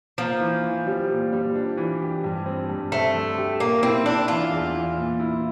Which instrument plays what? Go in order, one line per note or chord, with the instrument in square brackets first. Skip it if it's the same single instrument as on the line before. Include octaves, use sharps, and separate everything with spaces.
[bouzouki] F3 [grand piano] A#3
[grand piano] E3
E3
G3
A#2
G3
D4
E3
G4
G2
C4
G2
[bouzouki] A3 [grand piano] C4
[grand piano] D3
G4
[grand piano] A#2 [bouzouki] A#3
[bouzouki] C4 [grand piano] E4
[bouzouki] D4 [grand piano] E4
[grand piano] E3 [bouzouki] F4
[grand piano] E2
E3
A#2
E4